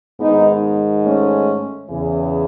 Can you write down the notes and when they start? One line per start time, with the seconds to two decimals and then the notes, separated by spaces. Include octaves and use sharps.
0.19 G#2 D#3 B3 D#4
1.04 A3 C#4
1.90 E2 C#3 E3